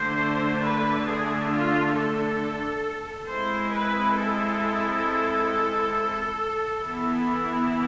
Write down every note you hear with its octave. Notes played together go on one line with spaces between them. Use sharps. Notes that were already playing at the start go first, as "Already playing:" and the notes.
Already playing: D3 A3 D4 C5
B4
G#4
F4
A4
G#3 C4 E4 C5
B4
A4
E3 B3 E4